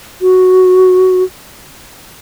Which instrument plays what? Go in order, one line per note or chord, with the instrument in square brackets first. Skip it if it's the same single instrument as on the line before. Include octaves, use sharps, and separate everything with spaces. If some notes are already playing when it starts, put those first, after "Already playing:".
[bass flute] F#4